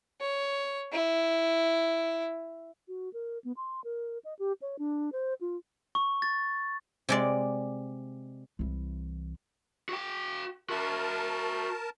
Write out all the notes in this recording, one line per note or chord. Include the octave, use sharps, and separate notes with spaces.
C#5
E4
F#4
A#4
B3
C6
A#4
D#5
G4
C#5
D4
C5
F4
C#6
A6
C3 G#3 D5
C2 E3
F#4 G5
F#4 A#4 E5 A5